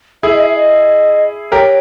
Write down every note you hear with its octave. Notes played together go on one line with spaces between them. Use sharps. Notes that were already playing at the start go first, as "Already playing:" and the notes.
E4 G#4 E5
D#5
E5
D#5
G4 A#4 C#5